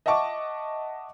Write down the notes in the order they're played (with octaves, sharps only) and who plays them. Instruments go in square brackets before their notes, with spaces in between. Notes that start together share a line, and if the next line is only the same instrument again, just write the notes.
[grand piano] D#5 E5 F#5 A5 C#6 D6